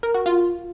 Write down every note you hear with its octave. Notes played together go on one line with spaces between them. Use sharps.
A#4
F#4
F4